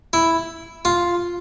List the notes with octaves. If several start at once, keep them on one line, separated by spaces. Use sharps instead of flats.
E4
F4